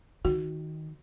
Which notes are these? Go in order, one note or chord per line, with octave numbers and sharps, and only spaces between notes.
D#3 F#4